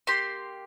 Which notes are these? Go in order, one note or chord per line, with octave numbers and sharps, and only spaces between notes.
A#3 G4 C6